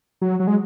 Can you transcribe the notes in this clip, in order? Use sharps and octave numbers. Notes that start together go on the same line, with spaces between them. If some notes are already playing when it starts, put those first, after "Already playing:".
F#3
F#3
G#3